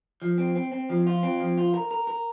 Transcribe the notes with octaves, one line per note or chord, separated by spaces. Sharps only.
F3
C4
C4
C4
F3
F4
C4
F3
F4
A#4
A#4
A#4